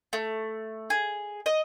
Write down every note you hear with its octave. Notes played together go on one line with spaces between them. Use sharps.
A3
G#4
D#5